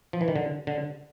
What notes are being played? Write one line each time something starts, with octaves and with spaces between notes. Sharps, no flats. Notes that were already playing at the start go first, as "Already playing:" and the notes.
F3
E3
D#3
D3
D3